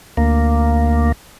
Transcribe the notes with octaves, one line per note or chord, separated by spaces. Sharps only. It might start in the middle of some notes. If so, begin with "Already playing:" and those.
D2 A#3